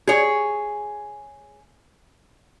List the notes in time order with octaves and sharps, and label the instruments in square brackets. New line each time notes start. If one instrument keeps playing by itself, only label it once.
[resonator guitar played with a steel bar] G#4 C#5